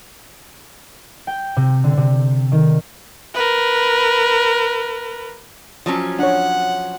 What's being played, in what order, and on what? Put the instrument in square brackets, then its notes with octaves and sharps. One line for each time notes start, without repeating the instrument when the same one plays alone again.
[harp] G5
C3
D3
C3
D#3
[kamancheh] A#4 B4
[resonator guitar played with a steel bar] F3 F#3 C#4
[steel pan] D4 C#5 [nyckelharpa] F#5